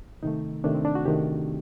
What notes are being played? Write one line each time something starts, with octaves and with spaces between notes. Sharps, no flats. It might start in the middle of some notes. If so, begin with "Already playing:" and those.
C3 D#3 A3 D#4
C3 D#3 A3 D4
C4
D4
F#4
C3 D#3 A3 G4